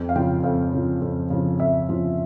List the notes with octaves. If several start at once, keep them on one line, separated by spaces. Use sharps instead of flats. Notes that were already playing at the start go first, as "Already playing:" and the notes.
Already playing: F2 G5
F5
C#3 F3 G5
F2 F5
C#3 F3
F2
C#3 F3
F2 E5
C#3 F3